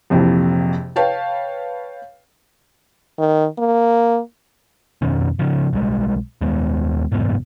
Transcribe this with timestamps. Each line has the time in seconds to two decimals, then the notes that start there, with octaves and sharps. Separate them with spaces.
0.10 A#1 F2 C3 E3
0.96 B4 C#5 F5 G5 A5
3.18 D#3
3.58 A#3
5.02 F2 B2 D#3 C#4
5.39 C#3 F3
5.73 B1 G3 G#3
6.41 D#2 G#3 B3
7.12 F#1 E2 G#2 B2